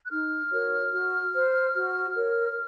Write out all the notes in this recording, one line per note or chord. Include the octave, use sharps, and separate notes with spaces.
F#6
D#4 F6
F#4 A#4 C#5
F#4
C5
F#4
A#4 C#5